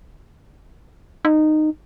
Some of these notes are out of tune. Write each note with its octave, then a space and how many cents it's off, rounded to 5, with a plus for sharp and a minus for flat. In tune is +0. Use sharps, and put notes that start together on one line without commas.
D#4 -15